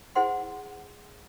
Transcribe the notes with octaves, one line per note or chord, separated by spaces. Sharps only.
E4 G#4 C5 F#5 C6